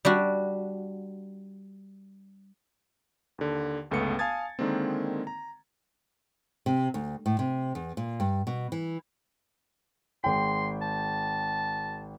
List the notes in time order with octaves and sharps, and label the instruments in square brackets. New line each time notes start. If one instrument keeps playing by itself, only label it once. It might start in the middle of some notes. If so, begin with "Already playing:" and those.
[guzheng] G3 D4 F#4
[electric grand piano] D#2 D3
G1 C#2 A3 B3 C#7
F5 G#5 A5 D#6 G#6 A6
D3 D#3 G#3 A#3 C4
A#5
[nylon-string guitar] C3
D2
A2
C3
E2
A#2
G2
B2
E3
[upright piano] G#1 G#4 G5 [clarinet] C6
[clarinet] A5